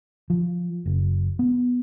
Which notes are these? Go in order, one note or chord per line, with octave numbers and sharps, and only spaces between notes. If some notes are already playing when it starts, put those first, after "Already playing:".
F3
F#1
B3